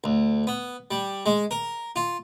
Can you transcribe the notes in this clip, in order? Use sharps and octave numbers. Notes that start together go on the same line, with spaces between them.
D2
B3
G3
G#3
A#4
F4